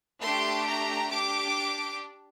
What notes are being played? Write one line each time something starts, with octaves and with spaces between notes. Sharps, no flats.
A3 D4 G4 C6
A#5
D4 G4 D6